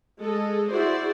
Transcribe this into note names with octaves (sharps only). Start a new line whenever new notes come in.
G#3 G#4 A4 D#5
E4 F#4 G#4 C5 D5